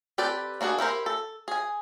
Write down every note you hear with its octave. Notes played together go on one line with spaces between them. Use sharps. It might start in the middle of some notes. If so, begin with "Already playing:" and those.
C4 G4 A4 B4 D5
A#3 D4 F#4 G#4
E4 G4 A#4 C5
A4
G#4 G#5